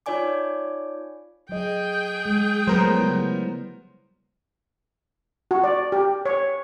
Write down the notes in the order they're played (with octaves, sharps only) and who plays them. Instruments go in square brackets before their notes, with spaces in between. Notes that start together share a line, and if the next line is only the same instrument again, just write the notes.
[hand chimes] D#4 F4 C#5 D5 G#5 D6
[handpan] F#3 D#5 [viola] G#4 G5
[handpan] G#3
[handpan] F3 F#3 A3 [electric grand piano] B3 A#4 C5
[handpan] C#3 G3 E4
[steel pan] F#4
D5
G4
C#5